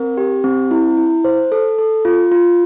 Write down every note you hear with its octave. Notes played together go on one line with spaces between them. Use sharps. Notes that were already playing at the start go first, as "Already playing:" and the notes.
Already playing: C4 A#4
G4
C4
E4
E4
C5
A4
A4
F4
F4